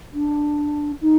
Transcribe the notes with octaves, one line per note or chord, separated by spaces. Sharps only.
D4
D#4